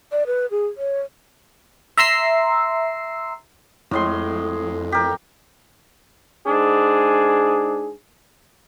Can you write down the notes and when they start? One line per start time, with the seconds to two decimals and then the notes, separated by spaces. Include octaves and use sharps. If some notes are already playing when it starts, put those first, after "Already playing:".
0.12 D5
0.27 B4
0.51 G#4
0.77 C#5
1.97 E5 A#5 C6 E6 C7
3.91 F2 A2 G#3 C6
4.92 G4 A#4
6.46 G#2 D4 G#4